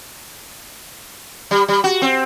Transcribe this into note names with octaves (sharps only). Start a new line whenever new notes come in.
G3
G3
F#4
C4